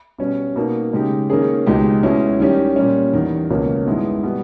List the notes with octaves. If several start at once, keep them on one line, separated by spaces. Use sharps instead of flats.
B2 G3 C#4
B2 A#3 D#4
C#3 G#3 D#4 G4
D#3 A#3 C#4 G#4
C#2 B2 G#3 D#4 G4
B2 G#3 C#4 E4
D#3 G3 C#4 G4
A#2 G3 C#4
E2 D#3 G3
C#2 B2 A#3 C#4
G2 D#3 G#3 B3 E4
B2 G3 B3